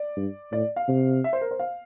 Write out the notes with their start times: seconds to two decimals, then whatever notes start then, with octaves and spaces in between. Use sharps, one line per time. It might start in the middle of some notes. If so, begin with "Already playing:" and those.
Already playing: D5
0.17 G2
0.52 A2 D5
0.76 F5
0.88 C3
1.24 E5
1.33 C5
1.41 A#4
1.51 C5
1.59 F5